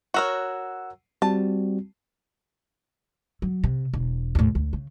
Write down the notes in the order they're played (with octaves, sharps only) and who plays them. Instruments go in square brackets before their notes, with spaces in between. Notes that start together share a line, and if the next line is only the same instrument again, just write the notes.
[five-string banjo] F#4 A#4 C#5 [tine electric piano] F#5 E6
[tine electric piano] G3 C4 F#4 [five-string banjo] A5
[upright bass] F#3
C3
E1
D#2 A2
D2
C#3